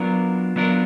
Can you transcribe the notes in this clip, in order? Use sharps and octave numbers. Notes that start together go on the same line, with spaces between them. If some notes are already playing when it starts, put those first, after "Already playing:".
Already playing: F#3 B3 D4 F4 A#4
F#3 B3 D4 F4 A#4